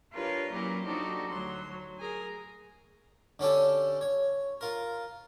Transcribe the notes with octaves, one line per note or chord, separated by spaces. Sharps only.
D4 F4 G4 A#4 B4 C#5
A#2 F#3 C#4 E4 G4 A#4
F3 D4 D#4 F#4 G4 A4
D2 F#3 C6
F#3
G#4 A#4 G#5
D3 C#4 G4 A4
C#5
F4 A#4